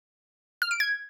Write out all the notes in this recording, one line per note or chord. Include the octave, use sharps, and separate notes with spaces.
F6
D7
G#6